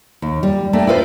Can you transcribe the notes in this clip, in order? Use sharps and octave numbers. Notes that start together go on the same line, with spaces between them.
D#2
G3
A3 A#3 D4 G5
E4 F4 B4 C5